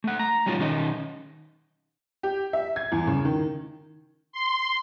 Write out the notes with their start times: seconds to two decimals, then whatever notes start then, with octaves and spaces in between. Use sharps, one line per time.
0.04 A3 F#5
0.19 A#5
0.46 F#3 G3 C#4 D#4 F4
0.59 D#3 C#4 D#4 D#5
2.23 G4
2.53 E5
2.76 G#6
2.92 E2
3.07 C#3
3.25 D#3
4.32 C6